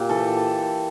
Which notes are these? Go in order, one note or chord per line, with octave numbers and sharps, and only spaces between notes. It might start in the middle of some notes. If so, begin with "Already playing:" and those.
Already playing: A#2 G4
E3 A4